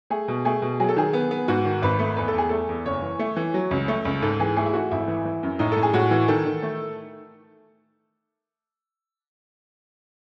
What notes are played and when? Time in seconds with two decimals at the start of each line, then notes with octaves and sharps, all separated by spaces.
0.10 A3 G#4
0.28 B2
0.45 A3 G#4
0.62 B2
0.80 F#3 G#4
0.89 A4
0.96 D#3 G#4
1.13 B3
1.31 B3
1.48 G#2 F#4
1.65 D#3
1.82 G#1 B4
1.99 A3
2.16 E2 B4
2.28 A4
2.34 E2 G#4
2.49 A3 A4
2.69 E2
2.86 F#1 C#5
3.02 E3
3.19 A3
3.37 E3
3.54 F#3
3.71 C#2
3.88 A3
4.05 C#2
4.22 G#2 A4
4.40 E3 G#4
4.56 A3 G#4
4.66 E4
4.73 A3 F#4
4.91 G#1 E4
5.08 E3
5.25 E3
5.43 F#2
5.59 A2 D#4
5.72 A2 A4
5.83 G#4
5.94 A2 F#4
6.11 E3
6.28 D#3 A4
6.46 D#3
6.62 A3